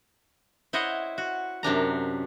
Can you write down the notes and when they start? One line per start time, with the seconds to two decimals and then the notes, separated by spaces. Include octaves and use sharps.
0.73 E4 C5 C#5 D#5 F#5
1.18 F#4
1.63 F#2 C3 D4 A#5